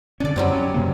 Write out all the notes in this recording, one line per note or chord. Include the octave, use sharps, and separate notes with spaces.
D3 C#4 D4 D5
F#2 F#3 G3 C4
C#4
F#2 C#3 A#3